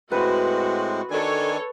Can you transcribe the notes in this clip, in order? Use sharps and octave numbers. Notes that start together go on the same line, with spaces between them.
A2 G#3 C4 F#4 B4
D#3 D4 A4 C#5 G#5